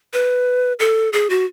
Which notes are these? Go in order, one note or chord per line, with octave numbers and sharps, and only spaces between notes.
B4
A4
G#4
F#4